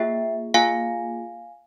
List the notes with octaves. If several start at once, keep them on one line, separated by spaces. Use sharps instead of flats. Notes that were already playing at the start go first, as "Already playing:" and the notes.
Already playing: A#3 F4 G#4 E5 G5
A#3 F4 G#4 F5 G#5